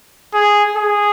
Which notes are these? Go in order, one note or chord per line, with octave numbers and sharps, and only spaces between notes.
G#4
G#4